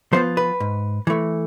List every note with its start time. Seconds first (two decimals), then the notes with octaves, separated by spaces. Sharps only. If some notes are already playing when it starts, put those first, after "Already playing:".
0.13 F3 B3 F4 C5
0.37 B4
0.60 G#2
1.07 E3 A3